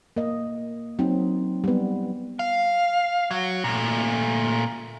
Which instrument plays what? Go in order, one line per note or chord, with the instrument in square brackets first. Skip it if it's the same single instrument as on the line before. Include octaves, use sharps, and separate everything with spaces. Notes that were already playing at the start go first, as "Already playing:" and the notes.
[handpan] A#3 D#5
F#3 C4 D#4
G3 B3
[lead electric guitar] F5
F#3
A#2 A3